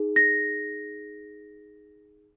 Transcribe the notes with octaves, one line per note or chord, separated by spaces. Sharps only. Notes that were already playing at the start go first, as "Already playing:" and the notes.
Already playing: D#4 G#4
A#6